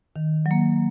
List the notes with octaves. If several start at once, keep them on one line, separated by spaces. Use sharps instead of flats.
D#3
F#3
A#3